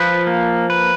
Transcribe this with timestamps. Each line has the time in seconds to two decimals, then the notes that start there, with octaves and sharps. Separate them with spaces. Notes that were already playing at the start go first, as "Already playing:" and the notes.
Already playing: F3 B4
0.27 A#3
0.70 B4